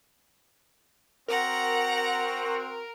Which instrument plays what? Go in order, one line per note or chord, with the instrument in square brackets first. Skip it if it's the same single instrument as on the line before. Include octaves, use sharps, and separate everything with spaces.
[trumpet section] C4 F#4 [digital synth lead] A#4 [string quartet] F#5 A#5